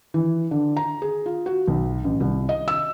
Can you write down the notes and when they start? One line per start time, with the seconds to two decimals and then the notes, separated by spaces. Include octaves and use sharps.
0.14 E3
0.51 D3
0.77 A#5
1.02 G#4
1.26 F4
1.46 F#4
1.68 B1
2.04 A1
2.20 C2
2.49 D#5
2.68 E6